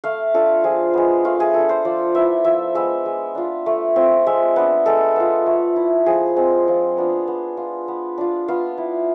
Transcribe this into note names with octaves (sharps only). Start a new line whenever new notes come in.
A3 F5
D4 F4 A4
F3 G#4
G#3 B3
A3 F4
G#4
D4 F4 A4
C5
F3 D5
B3 E4 E5
F3 E5
G#3 B3 E5
G#3
D4 F4
A3
C4 F4
G#3 E5
B3 D4
G#3 A4
B3 F4
A3
E4
F3 G#4
G#3 C4
F3
B3 D4 F4
B3
F4
B3
D4 F4
B3 F4
E4